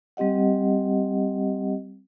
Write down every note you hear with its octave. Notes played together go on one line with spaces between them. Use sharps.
G3 C4 G4 D#5 F#5